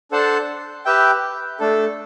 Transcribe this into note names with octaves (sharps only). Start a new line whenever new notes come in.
D4 A4 C5 F#5 A5
G4 B4 E5 G5
A3 D4 A4